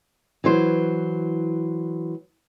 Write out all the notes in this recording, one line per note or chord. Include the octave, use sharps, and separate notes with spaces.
E3 F#3 C5